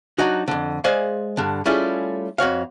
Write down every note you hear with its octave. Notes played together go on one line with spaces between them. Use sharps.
F#3 D4 D#4 F#4
F2 D3
G#3 G#4 C5 D5 F5
G2 D3
G3 A3 C#4 E4 F4 G#4
F2 F#4 C#5 F5